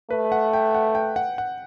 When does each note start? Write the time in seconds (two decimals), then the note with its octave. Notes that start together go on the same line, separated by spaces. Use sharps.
0.10 A3 B4
0.32 F#5
0.53 G5
0.75 F#5
0.95 G5
1.16 F#5
1.38 F#5